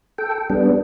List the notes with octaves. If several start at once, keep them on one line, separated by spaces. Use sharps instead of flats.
A4 G5
G3 B3 D4